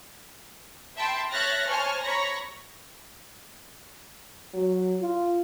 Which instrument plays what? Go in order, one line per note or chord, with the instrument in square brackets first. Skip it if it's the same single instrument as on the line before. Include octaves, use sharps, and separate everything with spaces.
[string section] E5 G5 A5 B5 C6
C#5 E5 F6 F#6 A6 A#6
C5 C#5 G#5 A5 C#6 F6
C#5 A#5 B5 C#6 A#6
[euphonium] F#3
F4